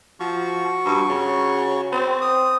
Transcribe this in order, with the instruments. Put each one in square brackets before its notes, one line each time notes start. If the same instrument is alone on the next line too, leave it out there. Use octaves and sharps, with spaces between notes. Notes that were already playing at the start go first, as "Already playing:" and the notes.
[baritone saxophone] F3 [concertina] F#4 C#6
[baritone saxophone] G2
C#3
C4
[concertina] D#6